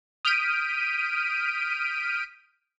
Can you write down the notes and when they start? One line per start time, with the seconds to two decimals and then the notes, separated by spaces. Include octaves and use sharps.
0.25 D#6 F6 G6 B6 D7 D#7